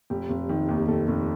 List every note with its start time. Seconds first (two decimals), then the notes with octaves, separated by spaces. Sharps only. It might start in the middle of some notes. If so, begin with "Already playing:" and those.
0.10 F1 G4
0.30 F1
0.49 D#3
0.69 D#2
0.77 G4
0.88 F1 A4
1.08 F1